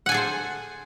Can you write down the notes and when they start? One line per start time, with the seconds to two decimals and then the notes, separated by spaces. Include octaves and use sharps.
0.06 F#5
0.09 G#5
0.12 A4
0.14 G#4
0.17 C5